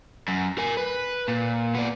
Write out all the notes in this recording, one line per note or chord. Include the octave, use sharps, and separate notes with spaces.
F#2
A#4 G#5
B4
A#2
B3 D5